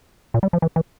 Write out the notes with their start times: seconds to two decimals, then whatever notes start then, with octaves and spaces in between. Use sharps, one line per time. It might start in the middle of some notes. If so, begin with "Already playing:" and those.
0.34 A#2
0.43 G3
0.53 F3
0.62 E3
0.76 E3